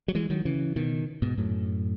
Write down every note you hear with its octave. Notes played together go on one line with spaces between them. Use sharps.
F#3
E3 G#3
D#3 F#3
C#3 E3
B2 D#3
G#2 B2
F#2 A2